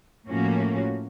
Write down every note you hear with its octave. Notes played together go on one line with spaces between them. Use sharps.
A2 F3 A#3 C#4 F#4